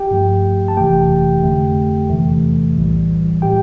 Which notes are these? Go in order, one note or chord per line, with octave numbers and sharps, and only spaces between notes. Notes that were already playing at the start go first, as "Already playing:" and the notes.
Already playing: G4 G5
G2 F3 A3
A5
G1 F2 C3 E3 A3 G4 G5
F2 D3 A3
E2 C3 E3 A3
B1 A2 E3 G3
A2 G3 G4 G5